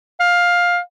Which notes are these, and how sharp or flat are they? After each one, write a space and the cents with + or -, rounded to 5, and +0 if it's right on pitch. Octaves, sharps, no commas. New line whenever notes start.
F5 +15